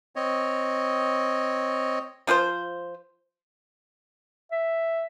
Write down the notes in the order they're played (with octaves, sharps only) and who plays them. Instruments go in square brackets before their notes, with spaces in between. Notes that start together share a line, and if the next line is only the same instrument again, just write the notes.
[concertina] C4 C#5 D#5
[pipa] F3 F4 B4 C5
[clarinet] E5